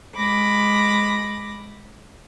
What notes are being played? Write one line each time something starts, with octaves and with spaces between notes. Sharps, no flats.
G#3 B5 D6 A#6